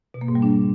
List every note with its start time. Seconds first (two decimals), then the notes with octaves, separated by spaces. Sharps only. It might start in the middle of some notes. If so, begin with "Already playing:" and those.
0.14 B2
0.21 A#3
0.28 G#2
0.35 G3
0.42 D4